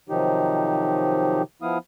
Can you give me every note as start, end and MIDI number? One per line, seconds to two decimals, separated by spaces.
0.09 1.42 48
0.09 1.42 51
0.09 1.42 53
0.09 1.42 54
0.09 1.42 63
0.09 1.42 67
1.62 1.78 53
1.62 1.78 59
1.62 1.78 64
1.62 1.78 77
1.62 1.78 87